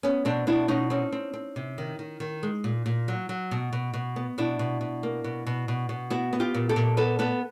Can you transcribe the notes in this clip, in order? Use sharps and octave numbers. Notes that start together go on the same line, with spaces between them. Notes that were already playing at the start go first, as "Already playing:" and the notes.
B3 C#4
B2 C4 D4
B2 D4 E4
B2 C#4 D#4
C4 C#4 D#4
C4
C4
C3
D#3
D#3
D#3
G#3
A#2
A#2
F#3
F#3
B2
B2
B2
B3
B2 D4 E4
B2
B2
A#3
B2
B2
B2
B2
B3 E4 F#4
B3
F4 G4
A#2
G4 A4
A#2
B3 A4 B4
B3 A4 B4